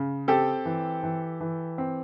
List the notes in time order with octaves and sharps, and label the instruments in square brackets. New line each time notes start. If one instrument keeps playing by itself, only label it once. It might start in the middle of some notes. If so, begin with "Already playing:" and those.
Already playing: [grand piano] C#3
C4 G4 A4
E3
E3
E3
C4